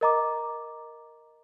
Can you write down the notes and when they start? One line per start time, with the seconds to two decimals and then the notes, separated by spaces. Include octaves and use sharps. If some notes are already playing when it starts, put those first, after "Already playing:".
0.01 A#4 D#5 A#5 D6